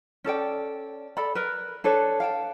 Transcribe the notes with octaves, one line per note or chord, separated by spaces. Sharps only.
C#4 A4 D5 G5
A4 D5 B5
A#4 B4
D4 A4 B4 C#5
F5 G5 A5